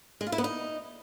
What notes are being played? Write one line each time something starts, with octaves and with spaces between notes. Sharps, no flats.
G#3
F4
E4
B3
D#4